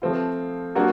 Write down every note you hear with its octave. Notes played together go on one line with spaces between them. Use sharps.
F3 A3 C4 F4
F#3 A#3 D4 F#4